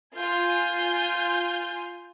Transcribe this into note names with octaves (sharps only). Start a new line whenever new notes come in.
F4 G#5 G6